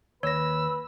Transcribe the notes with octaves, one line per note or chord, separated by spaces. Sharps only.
D#2 B4 C#5 E6 A#6